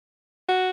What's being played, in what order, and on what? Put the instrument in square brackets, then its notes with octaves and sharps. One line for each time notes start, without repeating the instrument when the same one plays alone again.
[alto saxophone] F#4